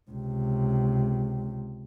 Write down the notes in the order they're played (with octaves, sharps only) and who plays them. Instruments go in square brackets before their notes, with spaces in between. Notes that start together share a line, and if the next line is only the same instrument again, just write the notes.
[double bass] C#2 C3